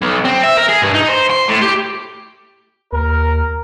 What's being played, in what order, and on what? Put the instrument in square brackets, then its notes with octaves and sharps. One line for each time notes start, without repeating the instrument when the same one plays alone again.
[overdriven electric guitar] B1
C4
E5
A#4
G#4
G2
D#4
C5
C6
A2
G4
[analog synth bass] D#2 [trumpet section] A#4